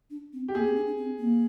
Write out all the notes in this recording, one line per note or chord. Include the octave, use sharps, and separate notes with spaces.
D4
C4
G4
A#3 G#4
C4
D4
D4
C4
A#3